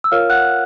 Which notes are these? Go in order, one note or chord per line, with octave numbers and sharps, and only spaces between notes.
E6
F4 A#4 C#5 F5 F6
F#5 F#6